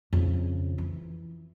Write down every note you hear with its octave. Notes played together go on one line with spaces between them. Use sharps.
F2 C#3
E3